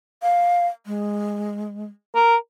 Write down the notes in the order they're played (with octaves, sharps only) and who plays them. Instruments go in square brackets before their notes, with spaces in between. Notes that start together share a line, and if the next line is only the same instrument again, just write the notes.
[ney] F5
G#3
[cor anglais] A#4